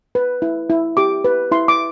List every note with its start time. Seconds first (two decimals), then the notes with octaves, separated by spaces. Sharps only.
0.15 B4
0.42 E4
0.70 E4
0.97 G4 D6
1.25 B4
1.52 E4 C6
1.68 D6